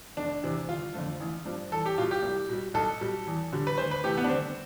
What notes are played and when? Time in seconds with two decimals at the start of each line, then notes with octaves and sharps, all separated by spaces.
0.17 F1 D4
0.43 E2 C3
0.68 G1 F4
0.94 F2 D3 F3 A3
1.20 A1
1.45 G2 F3
1.71 E2 A4
1.85 G4
1.98 B2 G3 F4
2.11 G4
2.23 C2
2.48 B2 G3
2.74 B1 A4
3.01 B2 G3
3.27 E2
3.53 D3 G3
3.67 B4
3.78 D2 C5
3.91 B4
4.04 C3 E3 A3 G4
4.17 B3
4.24 D4
4.29 G1 C4